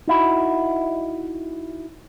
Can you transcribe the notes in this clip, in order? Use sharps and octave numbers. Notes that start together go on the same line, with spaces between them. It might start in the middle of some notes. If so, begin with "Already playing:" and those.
D#4 E4 F#4